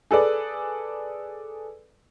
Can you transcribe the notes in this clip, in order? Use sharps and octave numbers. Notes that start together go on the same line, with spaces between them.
G#4 A4 B4 D5